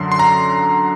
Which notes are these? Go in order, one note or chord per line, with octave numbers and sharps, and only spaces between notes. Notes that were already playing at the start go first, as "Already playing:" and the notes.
Already playing: F#2 D3 F#3 C6
C6
A#5